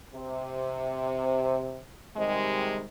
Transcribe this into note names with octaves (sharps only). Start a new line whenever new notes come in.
C3
C3 D#3 G3 G#3